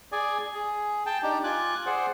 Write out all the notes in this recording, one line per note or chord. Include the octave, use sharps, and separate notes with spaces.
G#4 D5 G#5
G#4
G5 A5
D4 D#4 G4
F4 G#5 D6 F#6
G#4 C5 D5 F#5